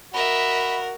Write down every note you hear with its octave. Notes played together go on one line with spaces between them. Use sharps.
F#4 A#4 D#5 E5 B5